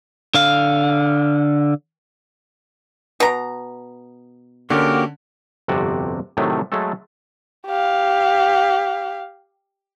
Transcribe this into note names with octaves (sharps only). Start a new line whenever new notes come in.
D3 F5
B2 A#5
D3 A#3 C#4 F#4 G4 A#4
G1 F2 C3 F#4 D5
A2 C3 D#3 F#3 A3
F#3 G#3 A3 A4
G4 F5